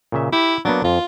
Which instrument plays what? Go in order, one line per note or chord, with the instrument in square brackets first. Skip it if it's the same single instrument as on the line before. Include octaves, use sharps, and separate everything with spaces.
[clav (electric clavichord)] A#2 C#3 E5
[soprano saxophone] E4 [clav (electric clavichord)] G4
[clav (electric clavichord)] F#3 A#3 B3 [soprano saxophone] D4
[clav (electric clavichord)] F2 [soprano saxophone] F4